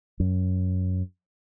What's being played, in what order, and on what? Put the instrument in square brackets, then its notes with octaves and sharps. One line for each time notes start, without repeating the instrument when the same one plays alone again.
[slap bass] F#2